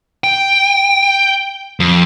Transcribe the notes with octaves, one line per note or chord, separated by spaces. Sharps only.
G5
F2